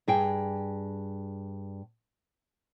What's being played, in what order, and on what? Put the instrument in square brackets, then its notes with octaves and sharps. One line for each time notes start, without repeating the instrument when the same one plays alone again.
[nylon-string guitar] G2 G#4 G5